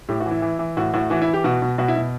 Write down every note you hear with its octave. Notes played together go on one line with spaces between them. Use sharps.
A2 G4
F#4
E3
E4
E3
E3
A2 F#4
A2 F#4
E3 F#4
E4
E3
G4
B2 F#4
B2
B2 F#4
E4
B2